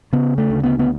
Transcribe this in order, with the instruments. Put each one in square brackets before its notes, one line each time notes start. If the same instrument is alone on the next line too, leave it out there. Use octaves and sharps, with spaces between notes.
[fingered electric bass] C#3 B3
A3
D2
B3
B3